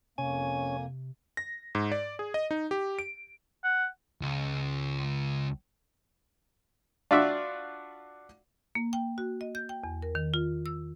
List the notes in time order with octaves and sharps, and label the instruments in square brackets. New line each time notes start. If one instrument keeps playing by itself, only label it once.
[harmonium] F2 A#3 [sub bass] C3 [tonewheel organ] C#4 [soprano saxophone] G#5
[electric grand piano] A#6
G#2
D5
G#4
D#5
D#4
G4
D7
[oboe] F#5
[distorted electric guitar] C#2
[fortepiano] D4 F4 F#4 D5 E5
[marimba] A#3
G5
F#4
D#5
G6
G5
E2
A#4
D#3
F4
E6